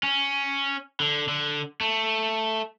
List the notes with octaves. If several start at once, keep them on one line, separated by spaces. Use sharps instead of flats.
C#4
D3
D3
A3